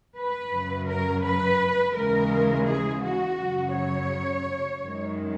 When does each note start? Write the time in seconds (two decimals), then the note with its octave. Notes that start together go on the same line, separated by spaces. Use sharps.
0.16 B4
0.51 F#2 C#3 F#3
0.87 A#4
1.24 B4
1.94 D#2 C#3 E3 G#3 A#4
2.66 G#4
3.03 F#4
3.38 F#2 C#3 F#3
3.74 C#5
4.82 F#2 D#3 G#3